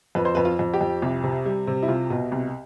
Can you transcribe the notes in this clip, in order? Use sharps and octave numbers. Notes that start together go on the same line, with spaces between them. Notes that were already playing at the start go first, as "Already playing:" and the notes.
F2 B4
C5
F2 B4
F4
F2
G4
F2
C2
C3
G3
C3
E4
C2 F4
B2
C2